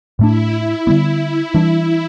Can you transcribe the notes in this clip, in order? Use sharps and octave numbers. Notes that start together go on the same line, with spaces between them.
A2 A3 D4 E4
E4
D3 G3 B3
E3 G3 D4